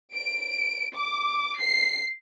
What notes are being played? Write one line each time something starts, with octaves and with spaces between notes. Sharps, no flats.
D7
D6
C7